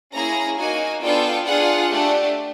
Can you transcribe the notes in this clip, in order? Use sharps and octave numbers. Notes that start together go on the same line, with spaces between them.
A#3 C#4 E4 G#4 A#5
A#3 D#4 F#4 G#5
B3 D4 F4 A4 G5
D4 F4 G#4 F#5
A3 D4 G4